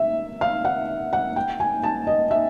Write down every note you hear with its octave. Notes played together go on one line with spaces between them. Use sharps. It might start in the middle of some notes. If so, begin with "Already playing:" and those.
Already playing: E5
F5
F#5
F#5
G5
G#5
A5
D#5
E5